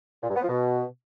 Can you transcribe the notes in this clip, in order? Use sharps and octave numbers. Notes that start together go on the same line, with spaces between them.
A#2
G2
B3
F3
B2